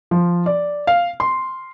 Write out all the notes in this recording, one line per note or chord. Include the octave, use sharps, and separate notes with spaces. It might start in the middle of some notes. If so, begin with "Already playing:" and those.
F3
D5
F5
C6